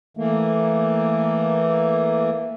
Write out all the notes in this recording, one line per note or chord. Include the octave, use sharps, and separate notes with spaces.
E3 A3 A#3